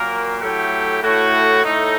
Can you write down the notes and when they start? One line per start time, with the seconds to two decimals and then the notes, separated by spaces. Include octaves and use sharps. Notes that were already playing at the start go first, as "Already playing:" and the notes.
Already playing: A#2 F#3 A#3 A#4
0.41 A2 F#3 A3 G4
1.02 A2 A3 F#4
1.64 A2 A3 D#4